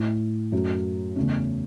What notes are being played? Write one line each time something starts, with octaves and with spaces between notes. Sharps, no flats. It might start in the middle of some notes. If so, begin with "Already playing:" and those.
Already playing: A2 A3 E4
F#2 F#3 A3
E2 C#3 A3 C#4